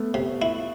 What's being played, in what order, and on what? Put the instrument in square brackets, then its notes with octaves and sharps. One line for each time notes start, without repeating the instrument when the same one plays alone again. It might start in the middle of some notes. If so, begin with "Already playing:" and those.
Already playing: [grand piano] A3 B3
[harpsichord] C3
E4